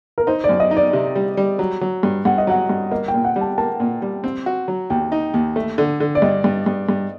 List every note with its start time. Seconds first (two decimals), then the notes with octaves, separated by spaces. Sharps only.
0.18 A#4
0.27 D#4 C5
0.44 D5
0.49 F#2
0.60 D#5
0.71 D#4
0.77 D5
0.93 C3
1.16 G3
1.37 G3
1.59 F#3
1.81 F#3
2.03 G2
2.25 G2 F#5
2.38 D#5
2.47 F#3 F#5
2.69 G2
2.91 A#3 D#5
3.08 G5
3.14 A#2
3.25 F#5
3.36 G3
3.41 A5
3.58 A#3 A5
3.80 A#2
4.02 G3
4.24 C4
4.46 F#4
4.68 F#3
4.90 D#2 G5
5.12 D#4
5.34 D#2
5.56 A3
5.78 D3
6.00 D3
6.15 D5
6.22 G2 D#5
6.44 G2
6.66 G2
6.89 G2